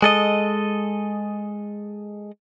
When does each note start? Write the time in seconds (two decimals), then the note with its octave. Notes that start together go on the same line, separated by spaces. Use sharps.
0.02 G#3 A4 D#5